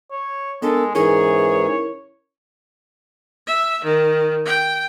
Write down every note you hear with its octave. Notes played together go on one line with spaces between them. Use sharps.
C#5
G#3 B3 D4 A4 A#4
G#2 E3 C#4 E4 G#4 A#4 C#5
E5
D#3
G5